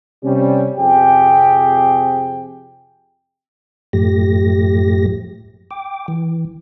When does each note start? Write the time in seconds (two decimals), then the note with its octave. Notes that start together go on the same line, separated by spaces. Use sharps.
0.24 C3 G3 C#4
0.78 F2 C3 G4 G#4 G5
3.93 F#2 A2 F3 A3 G4 A#6
5.71 G5 D6
6.08 E3